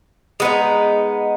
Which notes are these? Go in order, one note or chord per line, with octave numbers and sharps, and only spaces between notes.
G#3 B3 D#4